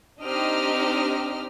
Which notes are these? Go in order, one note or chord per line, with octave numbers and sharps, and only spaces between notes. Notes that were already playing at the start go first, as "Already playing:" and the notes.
C4 D4 D#4 G4 D#5 F6